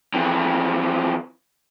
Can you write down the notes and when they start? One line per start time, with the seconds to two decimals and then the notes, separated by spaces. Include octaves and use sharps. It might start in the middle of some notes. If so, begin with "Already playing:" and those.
0.14 F2 E3